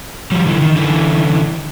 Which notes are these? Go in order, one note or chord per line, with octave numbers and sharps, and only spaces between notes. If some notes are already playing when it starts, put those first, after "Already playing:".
F3 G3
D3 E3
D#3
D3 E3